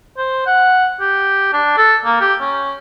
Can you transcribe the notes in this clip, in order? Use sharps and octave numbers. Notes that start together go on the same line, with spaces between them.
C5
F#5
G4
D4
A4
A#3
G4
C#4